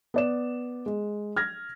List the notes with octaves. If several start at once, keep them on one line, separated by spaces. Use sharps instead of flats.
B3 D5 E7
G#3
F6 G#6 A#6